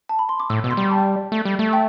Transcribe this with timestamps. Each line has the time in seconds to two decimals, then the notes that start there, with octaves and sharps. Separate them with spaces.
0.09 A5
0.19 B5
0.29 C6
0.40 D6
0.50 A2 E6
0.64 B2
0.71 C6
0.77 G3
0.91 A5
1.32 A3
1.45 G3
1.59 A3
1.73 G5